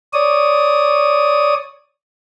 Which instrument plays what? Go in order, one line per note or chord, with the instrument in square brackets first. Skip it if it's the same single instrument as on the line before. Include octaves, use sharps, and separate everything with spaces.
[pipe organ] C#5 D5 D#6